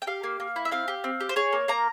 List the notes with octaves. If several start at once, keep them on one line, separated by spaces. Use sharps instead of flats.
G5
G4 F5
A#3
A#3
E4
E5
C4 F5
G4
C4
G4
C5
G#4 C#5
A#3
A#3 A#5